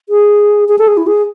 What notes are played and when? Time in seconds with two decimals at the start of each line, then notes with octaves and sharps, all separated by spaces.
0.09 G#4
0.69 G#4
0.79 A4
0.88 G#4
0.97 E4
1.07 G#4